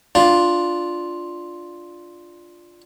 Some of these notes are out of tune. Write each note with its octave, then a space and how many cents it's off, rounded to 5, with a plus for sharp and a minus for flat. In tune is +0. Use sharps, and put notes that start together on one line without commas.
D4 +0 F4 +0